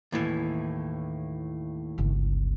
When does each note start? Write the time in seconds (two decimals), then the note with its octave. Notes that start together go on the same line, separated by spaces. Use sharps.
0.12 D#2 A2 E3
1.98 G1 C#2